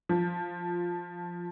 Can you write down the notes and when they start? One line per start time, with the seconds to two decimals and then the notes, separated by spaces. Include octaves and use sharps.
0.09 F3